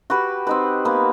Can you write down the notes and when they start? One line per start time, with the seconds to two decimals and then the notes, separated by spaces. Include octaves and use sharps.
0.10 F#4 G4 B4
0.47 C4 D#4 B4
0.85 A#3 B3 B4